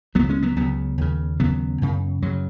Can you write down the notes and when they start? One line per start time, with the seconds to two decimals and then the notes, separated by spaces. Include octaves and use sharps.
0.15 C#2 C#3 F#3 B3
0.29 G#3 C#4
0.42 F#3 B3
0.56 C#2 C#3 F#3 B3
0.98 D#2 C#3
1.40 D#2 C#3 F#3 B3
1.82 F#2 C#3
2.22 F#2 C#3 F#3